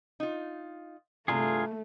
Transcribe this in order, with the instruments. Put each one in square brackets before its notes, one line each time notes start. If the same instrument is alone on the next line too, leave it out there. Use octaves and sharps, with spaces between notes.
[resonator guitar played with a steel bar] D#4 F4
[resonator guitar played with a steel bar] G2 C3 E3 [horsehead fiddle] A3 [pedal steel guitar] F4 G#4